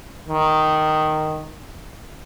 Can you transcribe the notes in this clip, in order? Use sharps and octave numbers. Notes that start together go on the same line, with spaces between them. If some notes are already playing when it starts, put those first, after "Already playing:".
D#3